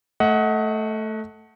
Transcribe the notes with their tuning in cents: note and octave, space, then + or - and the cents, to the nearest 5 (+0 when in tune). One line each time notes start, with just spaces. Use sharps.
A3 +0 D#5 +35 F#5 +0